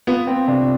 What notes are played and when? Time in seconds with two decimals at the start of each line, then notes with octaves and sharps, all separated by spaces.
0.07 B3 F4
0.27 C4
0.48 C3 D4